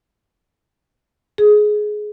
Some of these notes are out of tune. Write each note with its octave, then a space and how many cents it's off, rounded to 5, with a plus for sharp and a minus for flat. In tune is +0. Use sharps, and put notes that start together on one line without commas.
G#4 +15